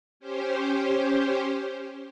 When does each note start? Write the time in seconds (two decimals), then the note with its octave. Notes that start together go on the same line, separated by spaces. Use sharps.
0.20 C#4 G4 C5